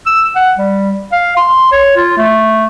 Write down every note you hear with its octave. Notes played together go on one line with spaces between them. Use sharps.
E6
F#5
G3
F5
C6
C#5
F4
A3